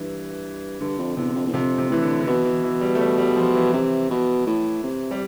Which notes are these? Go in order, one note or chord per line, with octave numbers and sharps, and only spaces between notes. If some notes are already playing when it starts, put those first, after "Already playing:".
Already playing: G2 E3
G2 D3
F2
E2 C3
F2
E2
F2 C3
C3
A2 E3
D3
D3
B2 E3
E3
E3
G3
A3
G3
G3
F3
E3
C3
B2
A2
C3
G3